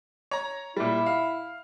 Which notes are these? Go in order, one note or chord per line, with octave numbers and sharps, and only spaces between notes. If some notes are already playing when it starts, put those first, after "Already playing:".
C#5 A#5
A#2 G3 E4
F5